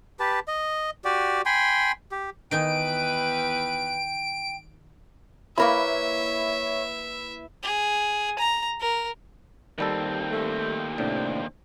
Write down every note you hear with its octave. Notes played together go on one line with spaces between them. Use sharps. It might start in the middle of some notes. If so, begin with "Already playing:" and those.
G4 B4 A5
D#5
F#4 G4 D5
G5 G#5 B5 C6
G4
E2 D#3 D#4 B4 G5 G#5 D7
A#3 E4 A#4 B4 C#5 E5 B5
G#4
A#5
A#4
D#2 D#3 G3 C4 A4
A3
A2 C3 D4